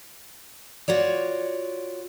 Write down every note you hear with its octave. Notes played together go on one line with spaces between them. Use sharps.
F4 F#4 C#5 D5